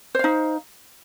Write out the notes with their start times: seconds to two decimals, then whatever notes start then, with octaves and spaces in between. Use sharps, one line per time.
0.15 C5
0.19 F5
0.24 D#4